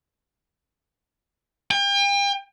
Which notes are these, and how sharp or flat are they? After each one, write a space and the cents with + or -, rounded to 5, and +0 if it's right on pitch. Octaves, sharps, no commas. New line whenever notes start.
G5 +40